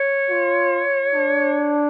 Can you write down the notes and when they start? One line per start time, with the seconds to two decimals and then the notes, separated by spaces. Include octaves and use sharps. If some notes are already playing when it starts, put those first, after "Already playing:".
Already playing: C#5
0.30 F4
1.14 D4